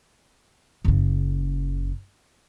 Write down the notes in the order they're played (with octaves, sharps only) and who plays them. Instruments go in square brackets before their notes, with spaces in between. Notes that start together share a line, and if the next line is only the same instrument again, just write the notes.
[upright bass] F#1 C#3